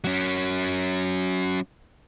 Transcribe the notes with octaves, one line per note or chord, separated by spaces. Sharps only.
F#3 C#4